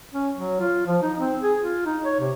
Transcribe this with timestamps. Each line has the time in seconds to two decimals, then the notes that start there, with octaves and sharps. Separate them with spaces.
0.13 C#4
0.36 F#3
0.61 F4
0.87 F3
1.02 D#4
1.19 C4
1.43 G#4
1.62 F4
1.86 D#4
2.05 C#5
2.20 C3